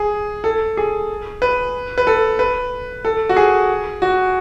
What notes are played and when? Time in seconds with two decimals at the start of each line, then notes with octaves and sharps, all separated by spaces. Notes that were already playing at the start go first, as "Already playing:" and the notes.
Already playing: G#4
0.44 A4
0.77 G#4
1.42 B4
1.98 B4
2.07 A4
2.39 B4
3.05 A4
3.29 F#4
3.36 G#4
4.02 F#4